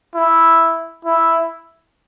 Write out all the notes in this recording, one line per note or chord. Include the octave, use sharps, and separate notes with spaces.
E4
E4